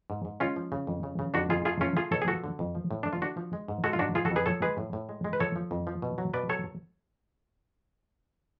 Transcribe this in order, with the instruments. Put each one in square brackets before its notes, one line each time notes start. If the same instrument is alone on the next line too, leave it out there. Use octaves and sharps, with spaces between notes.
[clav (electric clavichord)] G#2
G#2
G#3 C#4 F4
F3
C#3
F2
C#3
C#3
F2 D4 F#4
F2 F4 G#4
A3 F4 G#4
A3 C#4 F4
A3 F4 G#4
B2 A4 C#5
G#4
F3 F#4 A4
D3
F2
F3
A2
A3 D4
F4
A3 D4 F#4
F3
G#3
G#2
G#3 F#4 A4
F4
G#2 D4 F#4
F3 F4 G#4
F#4 A4
F2
G#4 B4
F3 A4 C#5
G#3 G#4 B4
A2
A2
G#3
G#3
B4
F3 A4 C#5
F3
F2
F3
B2
F#3
B2 B4 D5
F#3 A4 C#5